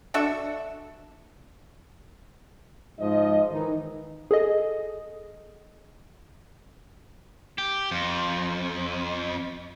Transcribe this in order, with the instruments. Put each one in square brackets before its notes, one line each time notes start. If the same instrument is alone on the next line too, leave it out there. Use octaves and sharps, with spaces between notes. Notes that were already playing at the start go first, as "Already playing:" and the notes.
[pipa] D4 F#4 A4 E5
[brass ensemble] G#2 F3 D#5
D#3 E3 D#4
[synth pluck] G#4 A4 D#5
[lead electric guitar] G4
F2